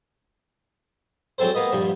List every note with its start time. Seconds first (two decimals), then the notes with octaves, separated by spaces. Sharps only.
1.38 F#3 G#3 C4 A4 C5
1.55 A#3 B3 D#5
1.72 A#1 G2 G3